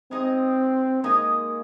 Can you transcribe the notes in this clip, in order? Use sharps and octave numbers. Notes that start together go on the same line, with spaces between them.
G#3 C4 D#4 G#4 D#5
G#3 A#3 D#4 G#4 D#5